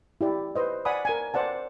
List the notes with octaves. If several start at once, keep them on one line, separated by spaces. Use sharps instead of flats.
E4 G4 D5
B4 C5 D#5
D5 F#5 G#5 B5 D#6
A#4 G#5
C5 D5 F#5 A5